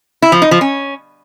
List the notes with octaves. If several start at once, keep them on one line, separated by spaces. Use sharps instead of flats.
E4
F3
D#4
F3
C#4